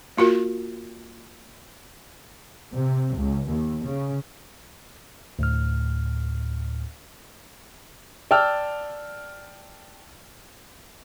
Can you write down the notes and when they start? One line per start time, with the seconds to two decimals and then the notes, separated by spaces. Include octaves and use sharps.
0.17 A#3 F4 F#4 A#4
2.76 C3
3.17 C#2
3.48 D#2
3.83 C#3
5.39 D2 A2 F6
8.31 D5 G5 A5 E6 F6